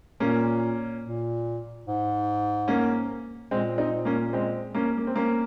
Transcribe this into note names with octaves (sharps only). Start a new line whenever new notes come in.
A#2 A#3 C#4
A#2
G#2
A#3 C#4
A#2 G#3 C4
C4 D#4
A#3 C#4
G#3 C4
A#3 C#4
A#3
C4
A#3 C#4